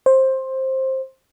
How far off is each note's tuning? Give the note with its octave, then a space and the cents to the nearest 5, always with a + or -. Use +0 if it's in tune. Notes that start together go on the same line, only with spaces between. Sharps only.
C5 +15